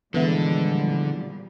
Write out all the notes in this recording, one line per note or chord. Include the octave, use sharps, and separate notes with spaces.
A#2 D3 E3 F3 G3 G#3 B3 E4